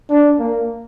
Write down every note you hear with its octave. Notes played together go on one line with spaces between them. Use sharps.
D4
A#3